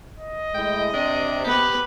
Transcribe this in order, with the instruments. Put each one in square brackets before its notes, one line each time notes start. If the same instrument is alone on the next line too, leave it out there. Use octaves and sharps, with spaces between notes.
[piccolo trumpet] D#5
[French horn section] A2 G#3 E4 [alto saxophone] G5
[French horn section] C3 [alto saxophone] D4
[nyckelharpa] B3 B4 [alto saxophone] G4